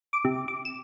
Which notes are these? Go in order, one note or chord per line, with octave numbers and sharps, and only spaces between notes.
D6
C3
D6
E7